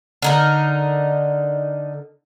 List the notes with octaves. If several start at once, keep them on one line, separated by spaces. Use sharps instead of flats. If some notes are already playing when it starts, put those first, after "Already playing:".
D3 D#4 A#4